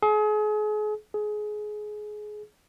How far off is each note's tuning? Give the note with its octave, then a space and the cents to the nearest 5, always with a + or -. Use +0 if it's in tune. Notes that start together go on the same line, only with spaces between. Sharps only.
G#4 +35
G#4 +20